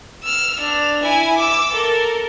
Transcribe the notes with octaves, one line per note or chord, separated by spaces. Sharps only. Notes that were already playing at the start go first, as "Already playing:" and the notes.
E6 F6
D4 F7
E4 G#5
D6 E6
A4 A#4